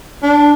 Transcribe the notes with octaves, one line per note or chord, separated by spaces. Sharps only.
D4